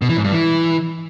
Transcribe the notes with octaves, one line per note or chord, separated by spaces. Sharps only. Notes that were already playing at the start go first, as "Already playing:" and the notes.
B2
E3
G#2
G2
E3